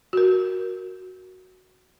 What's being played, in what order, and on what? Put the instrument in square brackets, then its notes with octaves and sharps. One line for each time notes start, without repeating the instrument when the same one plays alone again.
[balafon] F#4 A#4